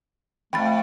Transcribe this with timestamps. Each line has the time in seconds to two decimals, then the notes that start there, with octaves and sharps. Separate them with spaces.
0.53 F2 A3 G5 B5 A6